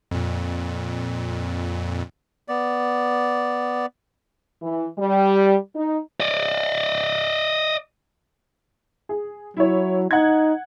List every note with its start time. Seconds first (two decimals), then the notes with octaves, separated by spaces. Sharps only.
0.11 F2 A#2
2.48 B3 D5
4.62 E3
4.99 G3
5.76 D#4
6.20 D5 D#5
9.09 G#4
9.57 F#3 E4 C#5
10.11 D#4 F#5 G#6